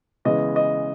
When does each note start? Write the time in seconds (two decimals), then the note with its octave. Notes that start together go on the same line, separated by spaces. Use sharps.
0.25 C#3 E3 G#3 B3 D#5
0.56 D#5